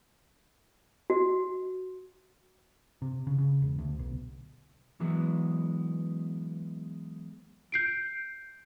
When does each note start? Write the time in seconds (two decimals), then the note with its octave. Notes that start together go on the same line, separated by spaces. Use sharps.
1.10 F#4
3.02 C3
3.27 C#3
3.38 C#3
3.62 E1
3.79 D2
3.99 B1
5.00 E3 F#3 G#3 B3
7.72 G6 C7 D7